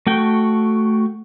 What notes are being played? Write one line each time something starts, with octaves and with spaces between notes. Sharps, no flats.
A3 F#4 G5